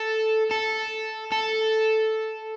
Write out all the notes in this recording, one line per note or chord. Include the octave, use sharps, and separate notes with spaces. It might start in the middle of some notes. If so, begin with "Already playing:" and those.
Already playing: A4
A4
A4